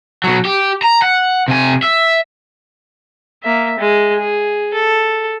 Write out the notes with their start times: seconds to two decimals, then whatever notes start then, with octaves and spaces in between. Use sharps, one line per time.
0.24 B2 F#3
0.45 G4
0.82 A#5
1.02 F#5
1.48 C3 G#5
1.83 E5
3.43 A#3 E5
3.79 G#3
4.17 G#4
4.74 A4